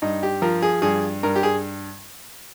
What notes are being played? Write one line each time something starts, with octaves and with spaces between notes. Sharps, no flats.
G2 D#4
G4
F3 A#4
G#4
G2 G#4
G2 A#4
G4
G#4